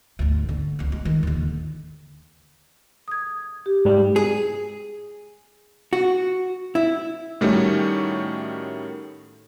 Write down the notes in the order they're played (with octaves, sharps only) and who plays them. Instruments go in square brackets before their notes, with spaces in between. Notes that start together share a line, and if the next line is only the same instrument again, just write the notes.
[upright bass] D2 G#2
D3
C#2 G3
G#3
D#3
D#2 D3
[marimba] D#6 G#6
G4
[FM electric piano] G#2 G3
[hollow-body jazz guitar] G#4
F#4
E4
[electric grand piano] A2 D#3 G3 A3 C#4 F#4